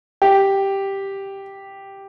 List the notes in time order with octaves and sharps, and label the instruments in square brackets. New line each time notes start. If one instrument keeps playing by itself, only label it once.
[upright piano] G4